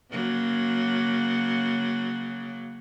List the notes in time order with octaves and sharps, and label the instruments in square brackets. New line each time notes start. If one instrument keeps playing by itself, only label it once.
[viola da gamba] C#3 F#3 A#3